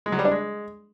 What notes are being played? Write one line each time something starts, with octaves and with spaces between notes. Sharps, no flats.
G#3
F#3
G3
D4
G#3